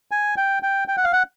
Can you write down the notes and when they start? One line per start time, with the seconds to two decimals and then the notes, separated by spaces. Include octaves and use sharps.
0.11 G#5
0.37 G5
0.63 G5
0.88 G5
0.97 F#5
1.04 F5
1.13 F#5